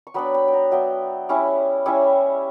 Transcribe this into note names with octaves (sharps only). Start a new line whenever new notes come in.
C#6
F#3 B3 D4 G5 B5
G5 B5
G5
F#5 A#5
F#3 B3 D4 E5 G5
G3 C#4 E4
G3 C#4 E4 C#5 E5